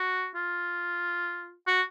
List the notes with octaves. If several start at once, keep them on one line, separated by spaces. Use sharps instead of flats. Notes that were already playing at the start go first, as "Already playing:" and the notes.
Already playing: F#4
F4
F#4